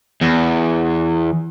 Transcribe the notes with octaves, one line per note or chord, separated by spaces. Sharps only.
E2